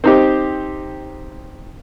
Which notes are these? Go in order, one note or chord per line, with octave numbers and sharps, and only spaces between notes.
C4 D#4 G4